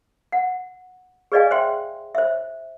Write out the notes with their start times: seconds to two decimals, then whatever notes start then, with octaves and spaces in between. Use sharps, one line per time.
0.32 F#5
1.32 G#4 B4 D5 D#5 F5 G#5
1.51 C5 E5 G5 C6
2.15 C5 E5